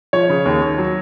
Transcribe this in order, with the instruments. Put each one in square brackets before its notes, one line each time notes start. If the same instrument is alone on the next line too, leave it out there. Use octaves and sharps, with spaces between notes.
[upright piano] F3 C#5
C#3
D#2
D#2
F#3